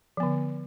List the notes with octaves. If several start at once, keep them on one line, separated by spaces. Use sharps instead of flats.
D3 F3 B3